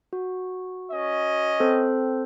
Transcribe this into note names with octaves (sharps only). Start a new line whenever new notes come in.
F#4
C#4 D#5
C4 A4 C5